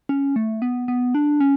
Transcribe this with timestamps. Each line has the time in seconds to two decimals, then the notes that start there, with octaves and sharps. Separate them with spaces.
0.09 C#4
0.36 A3
0.62 B3
0.88 B3
1.15 D4
1.40 C#4